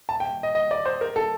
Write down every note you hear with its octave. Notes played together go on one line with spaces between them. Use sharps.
A5
G5
D#5
D#5
D5
C5
A#4
A4